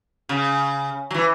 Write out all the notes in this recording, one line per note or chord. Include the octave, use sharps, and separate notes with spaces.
C#3
F#3
E3